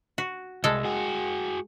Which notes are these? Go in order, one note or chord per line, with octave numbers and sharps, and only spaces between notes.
F#4
C2 G#3 A4
F#4 G#4